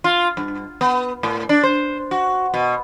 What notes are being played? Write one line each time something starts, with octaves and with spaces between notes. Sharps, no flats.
F4
G2
B3
A2
D4
C5
F#4
B2